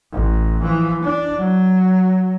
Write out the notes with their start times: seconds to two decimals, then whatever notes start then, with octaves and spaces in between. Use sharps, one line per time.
0.13 A1
0.62 E3 F3
1.02 D4
1.38 F#3